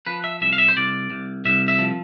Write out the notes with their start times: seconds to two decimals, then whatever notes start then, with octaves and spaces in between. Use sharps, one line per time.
0.06 F3 B4
0.24 E5
0.41 C2 E5
0.53 F5
0.58 E5
0.68 C5
0.76 C2 D5
1.11 C2
1.45 C2 E5
1.68 E5
1.79 F3